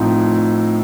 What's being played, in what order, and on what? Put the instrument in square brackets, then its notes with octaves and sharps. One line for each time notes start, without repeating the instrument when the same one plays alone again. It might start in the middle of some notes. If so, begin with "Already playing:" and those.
Already playing: [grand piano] A2 F3 C4 D#4